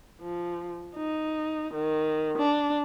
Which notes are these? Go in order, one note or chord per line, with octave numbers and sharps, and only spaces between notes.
F3
D#4
D#3
D4